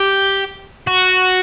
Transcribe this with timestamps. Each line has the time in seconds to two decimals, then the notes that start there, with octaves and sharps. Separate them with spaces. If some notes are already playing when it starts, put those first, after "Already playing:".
Already playing: G4
0.87 F#4